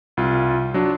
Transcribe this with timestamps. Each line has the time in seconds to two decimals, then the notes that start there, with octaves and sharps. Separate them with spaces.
0.17 C2 F4
0.74 F#3 D4